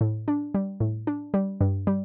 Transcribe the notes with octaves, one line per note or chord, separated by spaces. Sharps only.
A2
D4
G3
A2
D4
G3
G2
G3